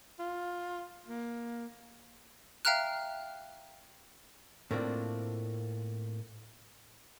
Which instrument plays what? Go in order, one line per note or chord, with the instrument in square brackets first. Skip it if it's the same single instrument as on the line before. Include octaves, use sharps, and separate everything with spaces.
[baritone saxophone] F4
A#3
[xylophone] E5 F5 G5 A#5 F6 F#6
[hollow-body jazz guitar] A2 A3 A#3 C4 D4 F4